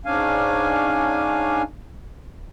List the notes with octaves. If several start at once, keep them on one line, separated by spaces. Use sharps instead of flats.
G#2 C#4 D4 F5 G#5